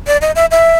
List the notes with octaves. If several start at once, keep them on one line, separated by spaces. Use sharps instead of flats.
D5
D#5
E5
E5